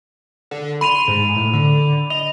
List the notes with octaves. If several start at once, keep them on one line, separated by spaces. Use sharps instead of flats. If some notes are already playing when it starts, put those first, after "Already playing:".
D3
B5 C6 D#7 F7
G#2
A2
D3
D#5 F7